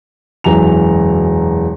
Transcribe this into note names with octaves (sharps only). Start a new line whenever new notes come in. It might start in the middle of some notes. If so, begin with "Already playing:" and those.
E1 F#2 E3 A#5 F7